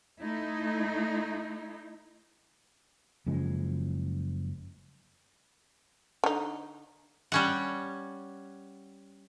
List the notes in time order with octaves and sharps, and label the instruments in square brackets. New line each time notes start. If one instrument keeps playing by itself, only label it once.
[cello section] A3 D#4 E4
[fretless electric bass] F#1 C#3 F3 G#3
[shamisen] D3 D#4
[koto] G3 C#4 F#5